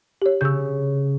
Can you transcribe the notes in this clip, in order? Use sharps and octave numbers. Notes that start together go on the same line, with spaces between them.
G4 C#5
C#3 E6 G6